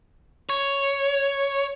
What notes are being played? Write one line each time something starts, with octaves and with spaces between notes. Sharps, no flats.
C#5